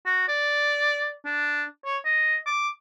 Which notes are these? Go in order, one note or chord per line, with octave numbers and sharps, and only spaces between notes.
F#4
D5
D4
C#5
D#5
D6